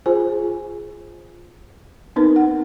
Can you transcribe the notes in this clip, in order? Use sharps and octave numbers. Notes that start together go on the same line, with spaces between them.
F4 G#4 C5 G#5
B3 C4 D#4 A#4 B4
F#5